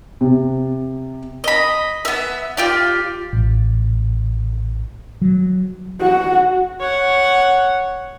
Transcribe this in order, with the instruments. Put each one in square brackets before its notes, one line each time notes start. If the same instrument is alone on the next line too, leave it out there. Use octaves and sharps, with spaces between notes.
[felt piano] C3
[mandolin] D#5 B5
B3 E5
F4 G4 D5
[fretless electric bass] A1
F#3
[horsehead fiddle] F#4
[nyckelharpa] C#5 F#5